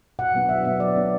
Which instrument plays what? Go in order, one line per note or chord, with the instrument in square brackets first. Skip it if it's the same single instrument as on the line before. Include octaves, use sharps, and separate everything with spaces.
[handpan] B2 F#5
F#3 B3 D4
B2 E5
F#3 B3 D4 E5
F#3 D5
B3 D4